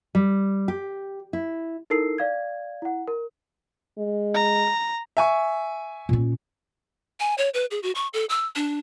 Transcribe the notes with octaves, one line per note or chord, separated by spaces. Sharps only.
G3
G4
E4
D#4 E4 A4 A#4 E6 C7
D5 F5 G#6
E4 F#5
A#4
G#3
A#5
E5 G#5 C#6
A#2 C#4
G#5
C#5
B4
G#4
F#4
C#6
A4
E6
D4